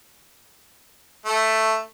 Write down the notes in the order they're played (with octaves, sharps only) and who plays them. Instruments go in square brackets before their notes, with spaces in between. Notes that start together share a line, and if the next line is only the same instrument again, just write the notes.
[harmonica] A3